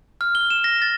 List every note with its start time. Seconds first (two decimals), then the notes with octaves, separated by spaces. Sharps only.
0.21 F6
0.35 G7
0.50 E7
0.64 A#6
0.82 A6